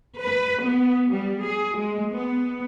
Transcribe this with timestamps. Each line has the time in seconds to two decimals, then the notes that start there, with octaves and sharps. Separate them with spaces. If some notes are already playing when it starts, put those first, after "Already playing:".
0.20 B4
0.63 B3
1.12 G3
1.45 G#4
1.77 G#3
2.11 B3